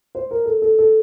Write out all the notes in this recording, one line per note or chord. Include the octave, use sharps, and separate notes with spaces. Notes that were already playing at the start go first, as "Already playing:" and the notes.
C5
A#4
A4
A4
A4